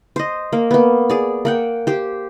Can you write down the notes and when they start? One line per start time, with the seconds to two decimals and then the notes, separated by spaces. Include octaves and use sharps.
0.16 C5 D#5
0.53 A#3
0.71 A#3 B3
1.10 G#4 D5
1.45 A#3 F#5 G5
1.87 G4 C5